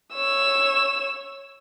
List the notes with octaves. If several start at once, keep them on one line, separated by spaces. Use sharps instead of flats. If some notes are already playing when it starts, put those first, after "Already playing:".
C#5 E6